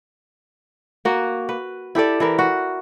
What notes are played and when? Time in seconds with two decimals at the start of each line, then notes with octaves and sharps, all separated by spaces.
1.05 A#3 F#4
1.49 B4
1.95 E4 G4 A4 D5
2.20 E3 E4 A#4
2.39 F#4